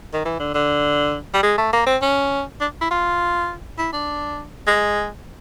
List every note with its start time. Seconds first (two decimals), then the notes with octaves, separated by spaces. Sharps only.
0.13 D#3
0.25 E3
0.39 D3
0.54 D3
1.34 G3
1.43 G#3
1.58 A3
1.73 A#3
1.86 C4
2.02 C#4
2.60 D4
2.81 E4
2.91 F4
3.78 E4
3.93 D4
4.67 G#3